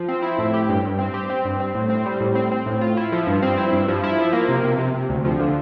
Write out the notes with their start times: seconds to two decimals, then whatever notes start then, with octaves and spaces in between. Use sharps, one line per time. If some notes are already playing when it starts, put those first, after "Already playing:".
Already playing: F3
0.08 C4
0.22 E4
0.38 A2
0.54 G4
0.69 G2
0.84 G2
0.99 C4
1.14 G4
1.30 C4
1.45 G2
1.60 C4
1.75 A2
1.90 C4
2.06 G3
2.20 A2
2.35 C4
2.52 C4
2.66 A2
2.81 F4
2.97 E4
3.12 F3
3.27 G2
3.42 C4
3.57 E4
3.73 G2
3.88 F3
4.04 E4
4.18 F3
4.33 A#3
4.48 C3
4.64 C3
4.78 C3
4.94 C3
5.09 D2
5.25 F3
5.39 D3